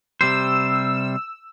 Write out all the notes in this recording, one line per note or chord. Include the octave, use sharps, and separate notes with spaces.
C3 G3 C5 E6